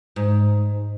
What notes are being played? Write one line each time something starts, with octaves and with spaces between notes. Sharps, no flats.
G#2